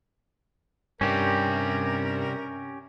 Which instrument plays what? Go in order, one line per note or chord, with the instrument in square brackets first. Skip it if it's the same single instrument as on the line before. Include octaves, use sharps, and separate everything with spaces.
[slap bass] G2 [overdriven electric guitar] C3 G3 [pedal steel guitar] C#4 G4 [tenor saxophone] A#4